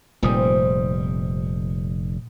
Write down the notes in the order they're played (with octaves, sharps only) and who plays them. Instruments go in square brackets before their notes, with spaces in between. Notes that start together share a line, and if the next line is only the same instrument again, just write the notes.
[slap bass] F1 G3 [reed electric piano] A#2 D#6 [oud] C4 D#4 G#4